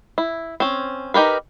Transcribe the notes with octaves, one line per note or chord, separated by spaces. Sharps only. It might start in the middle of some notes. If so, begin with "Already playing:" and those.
E4
C4 C#4
D#4 G4 A#4 B4